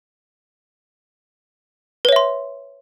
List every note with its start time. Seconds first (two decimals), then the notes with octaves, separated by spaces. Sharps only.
2.05 B4
2.09 C#5
2.12 E5
2.16 C6